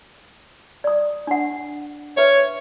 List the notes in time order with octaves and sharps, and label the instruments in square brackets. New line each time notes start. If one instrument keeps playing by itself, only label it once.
[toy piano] D5 D#6
D4 F#5
[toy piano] B4 E5 [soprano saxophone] C#5